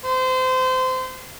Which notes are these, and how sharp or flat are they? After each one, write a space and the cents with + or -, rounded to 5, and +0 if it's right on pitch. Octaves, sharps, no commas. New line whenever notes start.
C5 -25